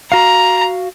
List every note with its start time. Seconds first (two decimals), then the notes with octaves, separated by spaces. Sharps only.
0.12 F#4 F5 A#5